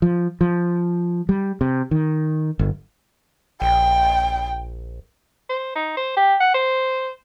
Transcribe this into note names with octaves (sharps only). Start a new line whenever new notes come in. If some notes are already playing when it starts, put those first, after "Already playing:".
F3
F3
G3
C3
D#3
G1
A#1 G5
C5
D#4
C5
G4
F#5
C5